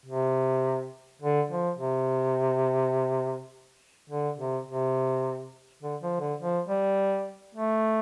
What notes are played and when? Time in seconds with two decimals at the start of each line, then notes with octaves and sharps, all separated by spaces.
0.06 C3
1.22 D3
1.51 F3
1.78 C3
4.10 D3
4.38 C3
4.67 C3
5.82 D3
6.02 F3
6.20 D3
6.40 F3
6.69 G3
7.55 A3